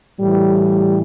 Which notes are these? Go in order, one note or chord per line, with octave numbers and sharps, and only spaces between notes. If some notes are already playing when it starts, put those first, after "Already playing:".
A2 E3 G3